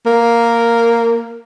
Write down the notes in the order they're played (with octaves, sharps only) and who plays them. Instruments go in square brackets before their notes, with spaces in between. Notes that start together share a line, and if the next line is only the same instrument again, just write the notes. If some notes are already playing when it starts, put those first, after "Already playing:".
[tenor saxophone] A#3